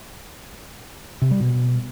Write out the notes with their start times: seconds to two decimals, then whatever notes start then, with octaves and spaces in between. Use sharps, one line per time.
1.22 C3
1.31 G3
1.41 B2